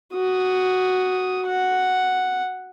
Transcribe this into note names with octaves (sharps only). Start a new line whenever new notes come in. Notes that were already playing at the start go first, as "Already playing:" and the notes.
F#4 D#6
F#5